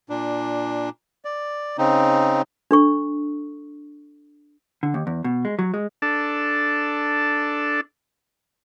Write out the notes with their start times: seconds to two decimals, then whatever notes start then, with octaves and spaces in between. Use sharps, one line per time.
0.10 A#2 D4
1.25 D5
1.78 C#3 C4 D#4
2.71 D4 A4 C#6
4.83 D3
4.94 D#2
5.07 E2
5.24 B2
5.45 G#3
5.59 F#3
5.74 G#3
6.02 D4 A4